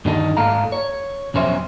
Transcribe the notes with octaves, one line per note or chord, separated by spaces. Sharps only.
G2 D3 D#3 D#4 A4
G#2 A3 A4 F5 A#5
C#5
B1 F2 C#4 C5 E5